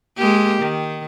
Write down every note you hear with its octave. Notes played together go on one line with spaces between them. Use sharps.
G#3 A#3 G4
D#3